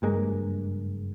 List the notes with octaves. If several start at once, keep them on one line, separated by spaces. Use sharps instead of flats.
F#1 G2 G#3 A#3